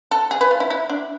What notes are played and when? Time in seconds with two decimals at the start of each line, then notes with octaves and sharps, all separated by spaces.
0.11 A4
0.31 G#4
0.41 B4
0.51 F4
0.60 E4
0.70 E4
0.89 D4